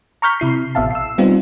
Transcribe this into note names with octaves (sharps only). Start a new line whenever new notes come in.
A#5 C#6 F6 G6 B6
C3 E4 C7
A1 B2 E5 F5 A5
E6 C7
G3 B3 C4 D#4 F4